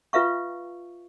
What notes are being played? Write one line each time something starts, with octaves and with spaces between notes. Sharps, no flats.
F4 B4 E5 F5 C#6